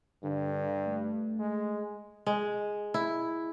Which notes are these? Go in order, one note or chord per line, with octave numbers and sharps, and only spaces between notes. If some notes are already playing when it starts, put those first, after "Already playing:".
G2 D3
A3
G#3
G#3
E4